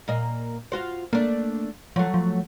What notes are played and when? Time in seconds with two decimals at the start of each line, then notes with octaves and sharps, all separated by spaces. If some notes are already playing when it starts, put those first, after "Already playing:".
0.08 A#2 A#3 D#5
0.72 F4 F#4 C5
1.13 A3 A#3 D4
1.96 F3 F#3 A3
2.14 F3